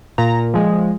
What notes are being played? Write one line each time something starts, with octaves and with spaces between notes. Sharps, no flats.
A#2 A#5
F3 G#3